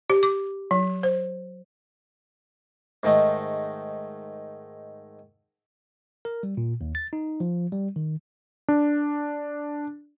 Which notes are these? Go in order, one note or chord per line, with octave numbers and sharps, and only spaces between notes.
G4
D6
F#3
C5
G#2 D#3 A3 D#4
A#4
G3
A#2
D#2
A6
D#4
F3
G3
D#3
D4